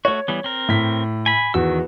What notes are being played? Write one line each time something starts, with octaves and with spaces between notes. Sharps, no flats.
A3 F#4 C#5
E3 G3 B3
C4 A#4
A2 B6
G#5 B5
E2 D#3 F#4 E6